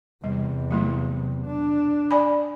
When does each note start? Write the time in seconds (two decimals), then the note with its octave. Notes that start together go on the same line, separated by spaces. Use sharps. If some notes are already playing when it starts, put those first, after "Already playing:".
0.24 E2 C3 G3
0.71 F#3 A3 E4
1.46 D4
2.11 D5 G#5 B5